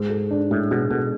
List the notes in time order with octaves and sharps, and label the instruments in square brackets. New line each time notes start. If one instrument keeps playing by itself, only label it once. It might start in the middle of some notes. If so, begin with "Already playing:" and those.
Already playing: [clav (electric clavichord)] G#2 [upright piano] G#3
[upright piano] A4
D4
[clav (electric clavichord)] A2 [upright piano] G#3
[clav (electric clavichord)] B2 [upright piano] G#3
[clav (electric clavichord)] B2 [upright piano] A4